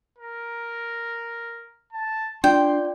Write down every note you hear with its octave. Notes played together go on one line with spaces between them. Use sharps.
A#4
A5
D4 F4 D5 G5 C6